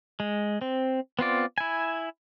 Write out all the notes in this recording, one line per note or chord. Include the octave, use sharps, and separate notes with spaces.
G#3
C4
B3 C4 F4 D5
E4 G#5